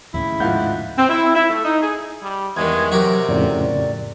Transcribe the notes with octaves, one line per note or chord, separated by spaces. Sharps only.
D#2 A2 C#3 E4
G#2 F3 F5 F#5 G6
C4
E4
E4
A3
D#4
G#4
G3
E2 G2 D#3 G#3 G#6
C3 F#3 F#4 G4 A#4
F2 A2 C#3 D5